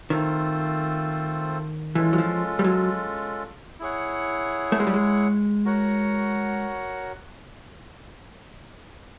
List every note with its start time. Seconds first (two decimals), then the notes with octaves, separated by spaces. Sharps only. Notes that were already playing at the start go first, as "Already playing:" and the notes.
0.10 D#3 A3 C4 F4 A4 C5
1.95 E3 G#3 C#4 F4 A4
2.13 F#3
2.18 F3
2.59 G3
2.64 F#3
3.80 E4 G#4 C#5 F#5
4.72 A3
4.80 G#3
4.87 G3
4.94 G#3
5.65 F#4 A#4 C#5 F#5